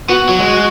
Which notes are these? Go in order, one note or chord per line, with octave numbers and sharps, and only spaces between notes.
B3 F#4
F#3
G#3